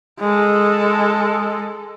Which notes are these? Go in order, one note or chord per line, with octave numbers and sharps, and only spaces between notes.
G#3 A4